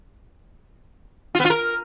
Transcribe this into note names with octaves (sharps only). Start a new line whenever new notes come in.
F4
B3
F4
A#4